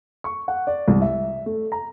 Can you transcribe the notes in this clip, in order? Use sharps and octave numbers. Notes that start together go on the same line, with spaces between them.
C#6
F#5
D5
C2
E5
A3
A#5